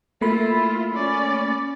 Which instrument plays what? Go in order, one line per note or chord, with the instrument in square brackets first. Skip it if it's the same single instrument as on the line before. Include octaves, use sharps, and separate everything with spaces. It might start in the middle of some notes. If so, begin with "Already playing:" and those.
[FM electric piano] A3 A#3 B5 [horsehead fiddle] E4 F4
[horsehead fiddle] C#4 D5